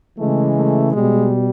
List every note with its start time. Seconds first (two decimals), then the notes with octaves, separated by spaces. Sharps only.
0.18 C#3 E3 G#3 A3
0.56 A3
0.92 B2 G3 G#3